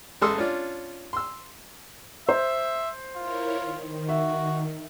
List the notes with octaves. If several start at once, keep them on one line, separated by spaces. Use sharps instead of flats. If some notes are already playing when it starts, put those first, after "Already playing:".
A1 G#3 A4 C6 D#6 E6
C#4 D4 F4
C6 E6
C5 E5
E4 F4 A#4 C#5
D#3
F#4 E5